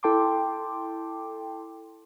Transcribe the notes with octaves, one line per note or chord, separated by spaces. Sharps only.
E4 A4 G5 A5 C6 D6